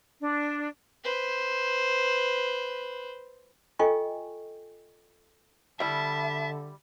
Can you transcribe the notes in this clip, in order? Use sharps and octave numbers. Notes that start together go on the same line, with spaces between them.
D4
B4 C5
F4 A4 D#5 G5 G#5 C#6
D3 G3 E4 E5 A5